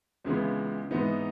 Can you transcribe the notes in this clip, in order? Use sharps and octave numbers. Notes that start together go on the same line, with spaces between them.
C#2 C#3 E3 G#3 B3
G#2 E3 B3 D#4